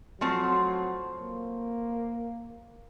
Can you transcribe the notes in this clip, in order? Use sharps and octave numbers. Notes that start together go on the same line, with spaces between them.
F3 F#3 A3 C4
A#3